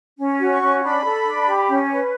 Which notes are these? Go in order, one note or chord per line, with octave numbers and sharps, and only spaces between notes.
C#4
F#4
C#6
C#4
D4 B5
A4
D4
G4
C#4
B4